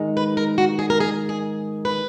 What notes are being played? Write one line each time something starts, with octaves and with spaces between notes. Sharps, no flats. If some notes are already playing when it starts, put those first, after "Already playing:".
Already playing: G#2 D#3 G#3 D#4
B4
A#4
F#4
G#4
A#4
G#4
G#4
B4